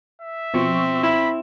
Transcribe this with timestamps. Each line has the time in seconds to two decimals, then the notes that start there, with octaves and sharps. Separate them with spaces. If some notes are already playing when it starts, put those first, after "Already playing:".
0.21 E5
0.54 B2 F3 C4 C#6
1.03 E4 B5